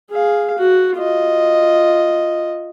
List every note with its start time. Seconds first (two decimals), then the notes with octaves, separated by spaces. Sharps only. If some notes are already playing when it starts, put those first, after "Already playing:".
0.10 G#4 F5
0.58 F#4
0.98 F4 D#5